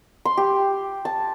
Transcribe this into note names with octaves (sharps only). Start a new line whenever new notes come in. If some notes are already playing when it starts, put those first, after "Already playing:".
C6
G4
A5